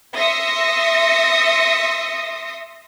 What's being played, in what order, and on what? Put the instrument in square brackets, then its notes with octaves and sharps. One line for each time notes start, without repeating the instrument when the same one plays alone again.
[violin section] E5 C6 D#6 A#6 C#7